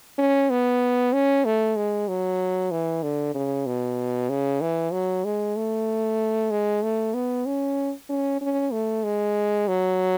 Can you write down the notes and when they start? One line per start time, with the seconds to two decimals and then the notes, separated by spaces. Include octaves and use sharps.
0.18 C#4
0.50 B3
1.13 C#4
1.45 A3
1.76 G#3
2.08 F#3
2.71 E3
3.03 D3
3.34 C#3
3.66 B2
4.30 C#3
4.61 E3
4.93 F#3
5.24 G#3
5.56 A3
6.51 G#3
6.83 A3
7.14 B3
7.46 C#4
8.09 C#4
8.41 C#4
8.72 A3
9.04 G#3
9.68 F#3